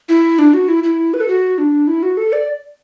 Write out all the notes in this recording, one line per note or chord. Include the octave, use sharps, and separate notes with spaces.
E4
D4
F#4
E4
E4
B4
A4
F#4
D4
E4
F#4
A4
D5